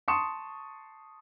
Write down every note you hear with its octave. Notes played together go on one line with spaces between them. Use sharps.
A5 C6 C#6 D#6 C#7 E7